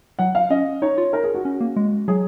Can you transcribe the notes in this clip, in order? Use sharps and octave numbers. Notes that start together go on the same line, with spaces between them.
F#3 F#5
F5
C#4 D#5
D#4 C#5
F4
D#4 A#4
G#4
F#4
C#4
A#3
G#3
F#3 G#4